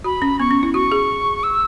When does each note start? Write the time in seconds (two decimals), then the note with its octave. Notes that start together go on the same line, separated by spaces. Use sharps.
0.04 F#4 B5
0.22 C#4
0.40 B3 C#6
0.51 C#4
0.63 E4
0.74 F#4 C#6
0.92 G#4
1.43 E6